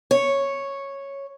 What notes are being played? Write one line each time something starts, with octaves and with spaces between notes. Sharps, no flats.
C#5